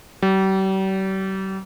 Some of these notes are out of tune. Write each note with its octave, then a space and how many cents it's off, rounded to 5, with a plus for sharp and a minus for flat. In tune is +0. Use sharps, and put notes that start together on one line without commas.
G3 -40